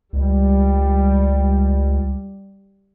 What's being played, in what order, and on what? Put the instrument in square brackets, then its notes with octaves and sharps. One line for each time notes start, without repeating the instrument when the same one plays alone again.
[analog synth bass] C#2 [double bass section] G3